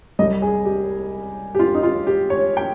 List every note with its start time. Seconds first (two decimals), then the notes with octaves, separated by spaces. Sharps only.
0.19 C2 C3 G3 D#5
0.42 G#4
0.65 G4
1.55 G4
1.59 F4
1.74 D#4
1.83 F4
2.07 G4
2.30 C#5
2.57 G5